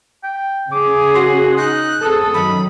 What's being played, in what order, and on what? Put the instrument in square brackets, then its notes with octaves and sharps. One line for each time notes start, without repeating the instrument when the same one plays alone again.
[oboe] G5
[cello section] C#3 C#4 G#4 [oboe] D6
[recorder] F#4 [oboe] C6
[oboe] D#4 [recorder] F#6
[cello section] C4 G#4 A4 [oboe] D#6
[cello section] F#2 D#3 [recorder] B5